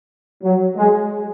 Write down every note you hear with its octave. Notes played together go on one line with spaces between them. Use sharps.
F#3
G#3